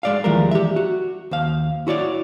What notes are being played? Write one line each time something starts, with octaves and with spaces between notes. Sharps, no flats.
G#3 D5 F5
D#2 E3 F3 G3 G#3 A#4
G4 E5
F#4
D#2 C5 F5
E4 F#4 C#5 D5